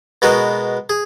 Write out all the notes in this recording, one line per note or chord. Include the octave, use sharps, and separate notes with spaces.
B2 G#3 B3 F#4 A#4
G#4